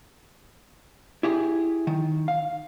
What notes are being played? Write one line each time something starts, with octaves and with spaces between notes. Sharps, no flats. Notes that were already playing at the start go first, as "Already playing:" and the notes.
E4 G4 G#4
D#3
F5